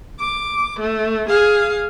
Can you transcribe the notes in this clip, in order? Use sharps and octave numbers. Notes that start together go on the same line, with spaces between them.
D6
A3
G#4 F5